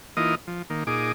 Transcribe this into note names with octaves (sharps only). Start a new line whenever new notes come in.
E3 A#3 D#4 F4 D#5
F3
D#3 A#3
A#2 D#4 G#4 D6